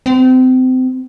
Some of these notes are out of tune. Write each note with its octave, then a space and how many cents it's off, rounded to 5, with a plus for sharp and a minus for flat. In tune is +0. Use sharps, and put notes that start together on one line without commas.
C4 -30